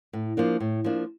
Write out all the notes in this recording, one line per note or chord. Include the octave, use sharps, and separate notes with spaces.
A2
F3 A#3 D4
A2
F3 A#3 D4